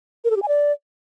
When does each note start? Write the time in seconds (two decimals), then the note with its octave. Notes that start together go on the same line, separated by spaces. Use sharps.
0.25 A#4
0.30 A4
0.36 G4
0.42 G#5
0.48 D5